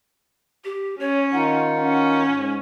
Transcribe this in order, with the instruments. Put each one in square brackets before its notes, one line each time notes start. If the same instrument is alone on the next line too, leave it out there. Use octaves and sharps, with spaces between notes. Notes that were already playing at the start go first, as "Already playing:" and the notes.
[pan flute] G4
[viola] C#4 [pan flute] C#5
[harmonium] D#3 D#4 F4 [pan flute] F#5
[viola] C#4
[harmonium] G#2